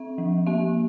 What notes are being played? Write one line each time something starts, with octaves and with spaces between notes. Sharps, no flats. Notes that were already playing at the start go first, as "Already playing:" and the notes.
Already playing: C4 E5
F3
A#3 E5